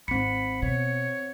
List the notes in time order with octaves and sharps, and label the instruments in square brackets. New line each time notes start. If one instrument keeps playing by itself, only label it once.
[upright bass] G#1 [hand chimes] C4 C#7 [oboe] B5
[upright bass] B2 [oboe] C#5